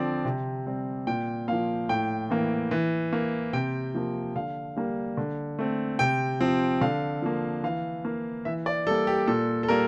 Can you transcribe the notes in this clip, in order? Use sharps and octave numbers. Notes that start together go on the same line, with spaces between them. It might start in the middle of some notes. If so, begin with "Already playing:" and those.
Already playing: D3 F3 C4 D5
C3
G3 C4
A#2 G5
F3 A#3 F5
A2 G5
E3 A#3
E3
A#3
C3 G5
F3 A#3
D3 F5
G3 A#3
D3
A3 C4
C3 G5
F3 C4
D3 F5
F3 A#3
E3 F5
A#3
E3 E5
D5
G3 A#3 A4
G4
A#2 A4
A4
G3 A#3 A#4